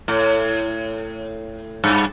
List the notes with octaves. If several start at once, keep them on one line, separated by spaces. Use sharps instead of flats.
A2
G2